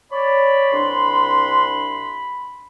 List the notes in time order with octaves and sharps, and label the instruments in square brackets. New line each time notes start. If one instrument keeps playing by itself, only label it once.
[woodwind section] C#5 D5 [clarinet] B5
[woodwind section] C2 D4 C6